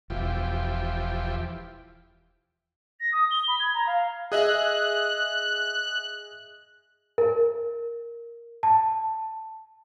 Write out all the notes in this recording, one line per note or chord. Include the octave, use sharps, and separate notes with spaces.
E1 E3 F3 G4
A#6
D#6
G7
B5
G#6
A#5
F5
G#4 D#5 E5 F#6
A#4
A5